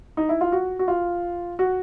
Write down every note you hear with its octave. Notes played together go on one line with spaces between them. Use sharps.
D#4
E4
F4
F#4
F#4
F4
F#4